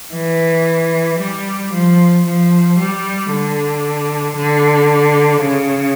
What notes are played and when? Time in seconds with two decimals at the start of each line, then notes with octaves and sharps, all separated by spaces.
0.14 E3
1.20 G3
1.73 F3
2.25 F3
2.78 G3
3.31 D3
4.36 D3
5.42 C#3